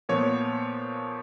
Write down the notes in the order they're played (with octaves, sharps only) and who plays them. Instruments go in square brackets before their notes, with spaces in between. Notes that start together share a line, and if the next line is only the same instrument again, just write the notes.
[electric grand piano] A#2 F3 B3 C#5